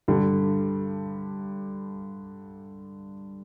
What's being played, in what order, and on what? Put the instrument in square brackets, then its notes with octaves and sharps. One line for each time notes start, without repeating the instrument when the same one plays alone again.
[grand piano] G2 D3 G3